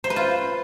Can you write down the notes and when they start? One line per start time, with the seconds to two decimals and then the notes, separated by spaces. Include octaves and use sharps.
0.04 C5
0.10 B4
0.16 F4